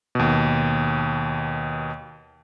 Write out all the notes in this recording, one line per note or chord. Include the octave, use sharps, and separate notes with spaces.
D#2 B2